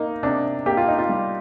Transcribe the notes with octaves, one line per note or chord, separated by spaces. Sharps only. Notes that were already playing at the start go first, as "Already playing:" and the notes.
Already playing: A#3 D#4
C3 D4
A#3 G4
F4
D#4
F4
G3